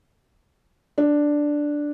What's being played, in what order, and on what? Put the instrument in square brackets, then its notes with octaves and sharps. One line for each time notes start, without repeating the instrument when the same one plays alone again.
[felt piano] D4